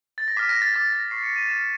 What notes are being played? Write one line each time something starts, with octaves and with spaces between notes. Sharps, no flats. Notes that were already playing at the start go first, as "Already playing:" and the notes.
A6
A#6
D6 F6 B6
A#6
A6
D6 F6 A6
A#6
C#6 F6 C7
C#7
D#7
C#6 F6 E7